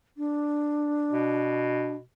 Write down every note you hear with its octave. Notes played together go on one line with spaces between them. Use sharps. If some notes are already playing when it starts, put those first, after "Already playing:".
D4
B2